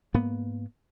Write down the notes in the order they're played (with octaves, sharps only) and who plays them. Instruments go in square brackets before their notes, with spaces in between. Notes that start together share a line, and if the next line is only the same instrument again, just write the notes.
[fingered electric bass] G#2 A#3 B3